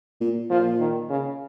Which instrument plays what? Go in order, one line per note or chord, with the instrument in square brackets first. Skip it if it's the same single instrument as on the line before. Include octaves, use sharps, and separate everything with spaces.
[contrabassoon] A#2
[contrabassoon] A#2 [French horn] F3
[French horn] D#3
C#3